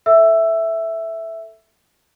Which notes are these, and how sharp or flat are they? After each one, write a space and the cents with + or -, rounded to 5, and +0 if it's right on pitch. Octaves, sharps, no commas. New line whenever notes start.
A4 +10 E5 +0 E6 +15